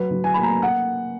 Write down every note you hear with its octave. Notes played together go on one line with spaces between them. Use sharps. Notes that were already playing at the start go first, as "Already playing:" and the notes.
Already playing: F#3 B4
F#3
G#5
A#3 B5
A#5
F#5